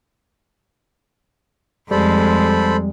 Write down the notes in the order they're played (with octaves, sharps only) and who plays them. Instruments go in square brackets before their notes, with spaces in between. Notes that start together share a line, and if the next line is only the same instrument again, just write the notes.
[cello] F2 G#3 [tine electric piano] G3 [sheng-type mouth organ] A4 C5 B5